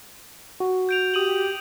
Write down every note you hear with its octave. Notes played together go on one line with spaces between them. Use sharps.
F#4
G6 D7 F7
G4 D#6 D#7 F#7